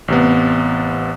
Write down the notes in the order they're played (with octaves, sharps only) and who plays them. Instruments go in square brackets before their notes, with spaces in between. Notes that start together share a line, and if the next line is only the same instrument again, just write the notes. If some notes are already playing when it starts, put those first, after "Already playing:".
[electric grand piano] A1 C3 B3